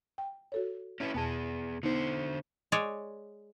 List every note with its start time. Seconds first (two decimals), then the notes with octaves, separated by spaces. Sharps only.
0.18 G5
0.52 F#4 A4 C#5
1.00 C#4 E4 B4
1.14 E2 B2 B3 G#4 A5
1.83 D3 B3 D#4 C5
2.72 G#3 C#5 D5